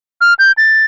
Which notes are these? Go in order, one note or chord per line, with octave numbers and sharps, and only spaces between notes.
F6
G6
A6